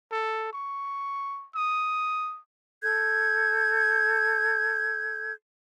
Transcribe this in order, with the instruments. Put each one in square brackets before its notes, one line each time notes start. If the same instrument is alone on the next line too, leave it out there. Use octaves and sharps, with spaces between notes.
[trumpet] A4
C#6
D#6
[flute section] A4 G6 G#6